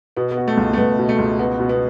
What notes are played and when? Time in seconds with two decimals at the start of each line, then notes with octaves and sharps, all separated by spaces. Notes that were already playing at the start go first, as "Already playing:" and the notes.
0.17 B2 B3
0.31 B3
0.37 F#4
0.48 A3
0.57 C#2
0.73 A3
0.78 C#2 B3
0.99 B2
1.09 A3
1.18 C#2
1.39 B3 F#4
1.60 B2
1.69 B3